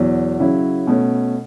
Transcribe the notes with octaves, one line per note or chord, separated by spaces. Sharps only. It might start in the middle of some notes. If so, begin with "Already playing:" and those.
Already playing: E2 B2 F#3
C#3 F#3 C#4 E4
B2 A3 C#4